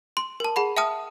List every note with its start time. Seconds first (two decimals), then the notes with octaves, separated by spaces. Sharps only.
0.17 C6
0.40 A#4 A5
0.56 G#4 F#5 B5
0.77 E5 G5 A5 D#6 F6